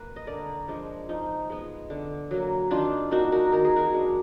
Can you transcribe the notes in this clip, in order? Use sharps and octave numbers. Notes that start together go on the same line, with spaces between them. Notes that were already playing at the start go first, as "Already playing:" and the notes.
Already playing: A#3 B4
D#5
D3 A#4 D5
F3 G#3 D4
F3 D#4
G#3 B3
D3
F#3 A#3
D#3 D4 F4
A#3 D4 D#4 F#4
F#4 A#4
D#3 A#4
G#4
F#4 A#4
G#3 D4